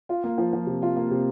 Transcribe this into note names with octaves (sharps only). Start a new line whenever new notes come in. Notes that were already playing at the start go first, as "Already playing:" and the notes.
F4
A#3
F3
F3
C3
F4
A#3
C3